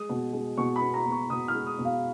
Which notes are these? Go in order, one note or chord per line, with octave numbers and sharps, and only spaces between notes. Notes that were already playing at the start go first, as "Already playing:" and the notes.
Already playing: G#3 D#6
B2
G#3
B2 C#6
B5
B3
A#5
B2
C#6
B2 D#6
F6
G#3
D#6
B2
F5